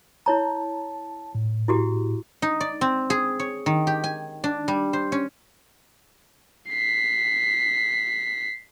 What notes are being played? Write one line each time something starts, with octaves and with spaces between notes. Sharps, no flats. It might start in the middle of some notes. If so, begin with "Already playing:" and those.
E4 C#5 A5 A#5
A2
E4 F#4 G4
D#4
D5
C4
G#4
C#5
D#3
G4
G#5
D4
G3
C5
C#4
B6 C7